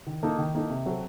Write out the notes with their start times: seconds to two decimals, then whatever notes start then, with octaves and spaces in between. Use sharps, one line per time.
0.07 D#3
0.23 A#3 D#4 A4
0.38 D#3
0.55 A#3 D#4 A4
0.70 C3
0.86 F#3 C4 F#4 A4